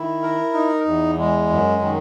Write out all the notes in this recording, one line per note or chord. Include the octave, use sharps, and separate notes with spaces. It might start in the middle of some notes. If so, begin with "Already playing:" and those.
Already playing: D#3 E4
A#4
D#4
E2
G#3
F#2
D#3